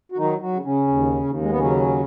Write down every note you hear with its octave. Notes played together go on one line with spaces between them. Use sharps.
F#4
D#3 F#3 D#4
F#3 F#4
C#3
C#3 C#4
D#2
D#2
G#3
B3
C#3 F#3 C#4